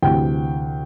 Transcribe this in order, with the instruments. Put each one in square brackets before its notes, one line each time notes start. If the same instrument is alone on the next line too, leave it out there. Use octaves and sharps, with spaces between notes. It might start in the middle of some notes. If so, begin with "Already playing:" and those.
[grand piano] D2 C3 E3 G5